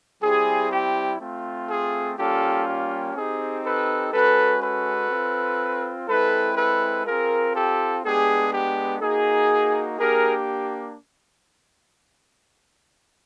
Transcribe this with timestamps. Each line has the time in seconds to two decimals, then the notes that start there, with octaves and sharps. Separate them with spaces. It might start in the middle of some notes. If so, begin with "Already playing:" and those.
0.22 G3 C4 E4 G4 G#4
0.72 G4
1.20 A3 C4 F4
1.69 G#4
2.18 G3 A#3 C#4 F4 G4 A4
2.67 G4
3.15 C4 D#4 G4 G#4
3.64 A4 B4
4.13 G#3 C#4 F#4 A4 B4
4.61 A4 B4
5.10 C4 F4
6.08 G#3 C4 E4 A4 B4
6.57 A4 B4
7.06 C4 F4 G#4 A#4
7.55 G4 A4
8.04 G#3 B3 D4 G4 G#4
8.52 G4
9.01 A#3 D#4 F#4 G#4
9.99 A#3 D4 G4 G#4 A#4